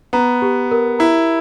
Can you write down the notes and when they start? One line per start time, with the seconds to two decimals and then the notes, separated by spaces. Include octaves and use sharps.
0.13 B3 A#5
0.42 G4
0.71 A#4
0.99 E4 A#5